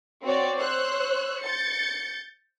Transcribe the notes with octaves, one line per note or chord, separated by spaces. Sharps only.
C4 F#4 C#5 D5
C5 C#5 E6 F#6
G6 A6 C#7